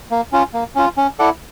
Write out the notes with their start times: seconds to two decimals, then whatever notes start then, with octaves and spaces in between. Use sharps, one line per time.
0.11 A#3
0.32 C#4 F4
0.54 A#3
0.76 C#4 F4
0.97 C#4
1.19 E4 A4 D5 F#5